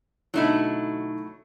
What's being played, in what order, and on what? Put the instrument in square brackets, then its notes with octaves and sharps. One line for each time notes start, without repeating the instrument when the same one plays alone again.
[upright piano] B1 D3 D#4 [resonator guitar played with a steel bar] F#3 A3 E4